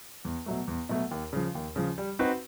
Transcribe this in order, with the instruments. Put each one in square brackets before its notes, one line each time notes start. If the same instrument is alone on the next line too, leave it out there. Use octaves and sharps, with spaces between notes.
[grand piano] E2
B2 F#3 A3
E2
B2 F#3 A3
D#2
C#3 F3
D#2
C#3 F3
G3
C4 D#4 F#4 B4